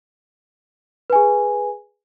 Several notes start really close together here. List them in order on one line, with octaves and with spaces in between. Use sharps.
B4 G#5 G#4